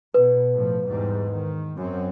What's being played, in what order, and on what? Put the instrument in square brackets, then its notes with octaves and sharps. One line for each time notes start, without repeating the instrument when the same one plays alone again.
[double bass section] B2 [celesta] B4
[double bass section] A2 F3
E2 G#2 G3
D#3
F#2 C4